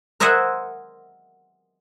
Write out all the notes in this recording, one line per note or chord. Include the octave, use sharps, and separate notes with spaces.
A#4 C5 D#5 E5 F#5 G#5